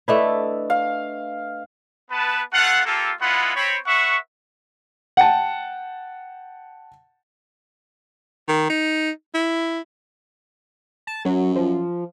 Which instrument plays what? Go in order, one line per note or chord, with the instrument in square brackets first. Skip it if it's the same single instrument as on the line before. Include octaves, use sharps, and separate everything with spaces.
[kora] A3 D4 E4 [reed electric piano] B4 D#5 E5
[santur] F5
[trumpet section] B3 B4 A5
A3 F4 A4 F5 F#5
A#3 F4 G4 A4
G#3 B3 E4 F4 F#5 B5
C4 C#5 B5
B4 E5 F#5 C#6
[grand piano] F#5 G5 A5
[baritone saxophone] D#3
D#4
E4
[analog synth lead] A5
[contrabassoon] F#2 [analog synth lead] F#3
[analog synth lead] F3